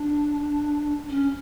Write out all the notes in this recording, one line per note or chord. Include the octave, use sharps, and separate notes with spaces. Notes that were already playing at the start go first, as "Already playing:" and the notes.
Already playing: D4
C#4